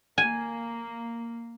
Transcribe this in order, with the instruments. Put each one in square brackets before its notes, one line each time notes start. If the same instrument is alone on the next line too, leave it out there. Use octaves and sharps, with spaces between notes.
[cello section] A#3 [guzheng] G#5